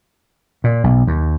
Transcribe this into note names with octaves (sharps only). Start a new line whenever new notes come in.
A#2
B1
D#2